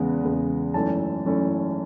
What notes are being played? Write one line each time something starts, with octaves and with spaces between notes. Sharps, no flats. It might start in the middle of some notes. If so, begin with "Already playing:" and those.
Already playing: E2 C#3 G#3 B3
E2 C#3 G#3 B3
G#1 F#2 E3 A3 C#4 A5
G#1 F#2 E3 A3 C#4